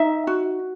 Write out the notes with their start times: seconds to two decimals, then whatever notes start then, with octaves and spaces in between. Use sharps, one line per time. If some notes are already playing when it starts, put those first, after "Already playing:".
Already playing: D#4 E5
0.27 F#4